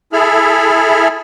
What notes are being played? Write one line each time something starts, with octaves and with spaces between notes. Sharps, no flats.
E4 G#4 A4 E5 B5 F6